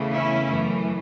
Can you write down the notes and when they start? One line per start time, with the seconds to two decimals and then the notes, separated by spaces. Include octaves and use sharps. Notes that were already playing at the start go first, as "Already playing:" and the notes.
Already playing: E2 C#3 E3 A3
0.13 C#4 E4
0.47 F#2 E3 A3